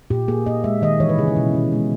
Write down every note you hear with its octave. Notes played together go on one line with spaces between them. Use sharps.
A#2 G4
A#3 G#4
A#3 D#5
G#3 E5
D#3 D#5
E3 C#5
B4
C#3 G#4
E4
B2
B2
G#3